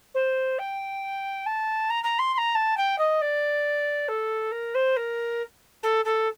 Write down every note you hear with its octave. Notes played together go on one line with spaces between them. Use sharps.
C5
G5
A5
A#5
A#5
C6
C6
A#5
A5
G5
D#5
D5
A4
A#4
C5
A#4
A4
A4